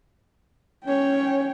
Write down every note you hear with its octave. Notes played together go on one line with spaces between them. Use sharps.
C#4 C#5 G5